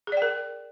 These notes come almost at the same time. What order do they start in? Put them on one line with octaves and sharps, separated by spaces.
G#4 D5 G5 A#4